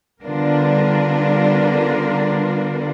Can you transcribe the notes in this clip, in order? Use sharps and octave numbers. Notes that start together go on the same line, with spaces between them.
D3 G3 B3 D4 F4 A#4